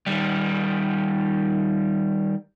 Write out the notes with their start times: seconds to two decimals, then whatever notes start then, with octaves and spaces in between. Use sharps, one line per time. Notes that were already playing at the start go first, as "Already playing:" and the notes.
0.07 D#3 G3